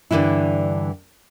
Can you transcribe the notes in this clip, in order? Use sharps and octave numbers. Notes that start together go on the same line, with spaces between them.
G2 A#2 D3 E3 E4